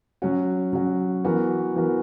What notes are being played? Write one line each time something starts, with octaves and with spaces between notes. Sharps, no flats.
F#3 C#4 F#4
F#3 C#4 F#4
E3 B3 F#4 A#4
E3 B3 F#4 A#4